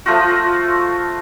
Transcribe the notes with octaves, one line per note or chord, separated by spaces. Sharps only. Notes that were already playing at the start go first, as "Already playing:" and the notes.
F3 A3 F4 F#4